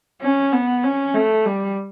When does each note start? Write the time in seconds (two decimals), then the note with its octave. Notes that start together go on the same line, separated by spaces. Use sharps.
0.22 C#4
0.53 B3
0.84 C#4
1.15 A3
1.46 G3